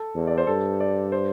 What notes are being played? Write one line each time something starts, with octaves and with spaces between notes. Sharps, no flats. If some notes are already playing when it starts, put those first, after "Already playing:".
Already playing: A4
E2
D5
C5
G2 A4
D5
C5